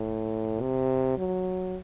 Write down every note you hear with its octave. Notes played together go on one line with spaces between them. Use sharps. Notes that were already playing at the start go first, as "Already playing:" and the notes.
Already playing: A2
C3
F#3